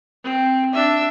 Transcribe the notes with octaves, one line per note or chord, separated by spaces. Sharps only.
C4
D4 E5